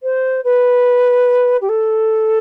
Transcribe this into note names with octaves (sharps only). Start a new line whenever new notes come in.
C5
B4
G4
A4